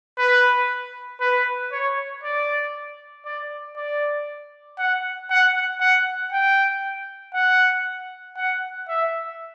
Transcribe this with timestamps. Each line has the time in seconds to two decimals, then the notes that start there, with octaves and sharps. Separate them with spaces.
0.18 B4
1.20 B4
1.72 C#5
2.24 D5
3.25 D5
3.76 D5
4.78 F#5
5.30 F#5
5.81 F#5
6.33 G5
7.34 F#5
8.37 F#5
8.88 E5